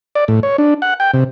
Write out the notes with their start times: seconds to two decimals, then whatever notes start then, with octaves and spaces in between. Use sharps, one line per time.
0.15 D5
0.28 A2
0.43 C#5
0.58 D4
0.82 F#5
1.00 G5
1.14 C3